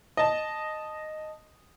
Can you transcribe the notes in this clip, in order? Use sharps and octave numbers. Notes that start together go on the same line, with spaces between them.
D#5 A5